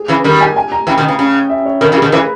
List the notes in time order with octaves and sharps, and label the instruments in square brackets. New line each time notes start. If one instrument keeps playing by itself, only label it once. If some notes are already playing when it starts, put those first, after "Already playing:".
Already playing: [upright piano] G#4
[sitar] C#3 E3
[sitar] D#3 G3 [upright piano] A#4
[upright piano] G#5
G#5
A#5
[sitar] C#3 E3 [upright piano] G5
[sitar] B2 D#3
C#3
C#3
[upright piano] E5
C#5
[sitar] B2 D#3 [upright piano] A#4
[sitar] C#3 E3
[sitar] B2 D#3 [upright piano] G#4
[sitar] C#3 E3 [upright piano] B4